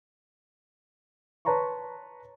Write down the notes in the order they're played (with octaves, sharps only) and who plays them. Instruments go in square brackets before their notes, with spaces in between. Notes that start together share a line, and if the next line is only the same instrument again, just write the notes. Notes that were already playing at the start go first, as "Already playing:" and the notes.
[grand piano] B4 C#5 A5 A#5 C6 C#6